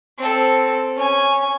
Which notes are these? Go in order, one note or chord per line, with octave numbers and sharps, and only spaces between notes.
C4 A4
C#4 G#5